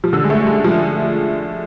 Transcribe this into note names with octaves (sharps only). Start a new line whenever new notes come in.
F3
D3
G#3
A3
G#3
F3